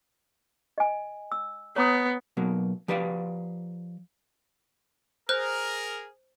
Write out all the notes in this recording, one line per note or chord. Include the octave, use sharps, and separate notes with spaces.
D#5 G#5
E6
B3 C#5 A#5 D#6
B2 F#3 A#3
F3 G4 B4 D5 F5
G#4 A#4 C5 F6 F#6